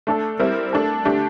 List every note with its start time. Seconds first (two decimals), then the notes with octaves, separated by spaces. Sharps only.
0.07 A3 D4 A4
0.39 G3 C4 E4 A#4
0.73 A3 D4 A4
1.05 D3 A3 D4 G4